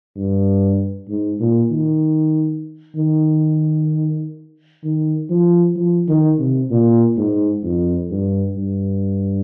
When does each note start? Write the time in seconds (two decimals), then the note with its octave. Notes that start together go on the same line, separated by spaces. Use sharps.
0.16 G2
1.09 G#2
1.40 A#2
1.71 D#3
2.96 D#3
4.84 D#3
5.30 F3
5.77 F3
6.09 D#3
6.40 C3
6.71 A#2
7.17 G#2
7.63 F2
8.11 G2
8.57 G2